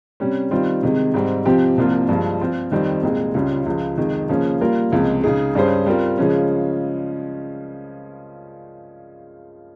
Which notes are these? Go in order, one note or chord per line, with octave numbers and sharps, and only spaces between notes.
C3 G3 C#4
D#3 G3 C4 F4
C3 D#3 G#3
G#2 G3 C4
C3 F3 C4 G4
C2 C3 F3 A#3 F4
G2 F3 G#3
F3 C4 F4
F2 D#3 G3 C4
C2 A#2 G#3 C4
C#2 C#3 G3 C#4 F4
C#2 C#3 F3
F2 C3 D#3 G#3
C#3 F3 A#3 C#4 G#4
G3 A#3 F4 A#4
C#2 C3 F3 G#3
C#3 G#3 D#4 G#4
G2 G3 C#4 G#4 C5
G3 C4 F4 A#4
C#3 F3 G#3 C#4